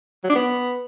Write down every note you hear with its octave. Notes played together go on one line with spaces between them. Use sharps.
F#3
D4
B3